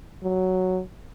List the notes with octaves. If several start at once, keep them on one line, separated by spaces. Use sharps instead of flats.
F#3